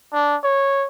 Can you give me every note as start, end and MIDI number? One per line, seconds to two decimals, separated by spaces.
0.13 0.36 62
0.44 0.87 73